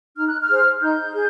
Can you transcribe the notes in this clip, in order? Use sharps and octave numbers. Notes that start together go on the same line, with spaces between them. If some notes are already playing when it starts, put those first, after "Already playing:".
D#4 F6
F#6
F6
G#4 C5
D#4 G6
G#4